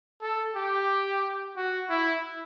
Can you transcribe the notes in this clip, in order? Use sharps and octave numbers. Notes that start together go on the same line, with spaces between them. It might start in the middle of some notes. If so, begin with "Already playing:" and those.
A4
G4
F#4
E4